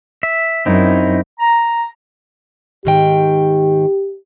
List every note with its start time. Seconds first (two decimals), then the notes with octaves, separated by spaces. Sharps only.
0.23 E5
0.66 F#2 C4 D#4 E4
1.39 A#5
2.85 G#2 D#3 G4 G5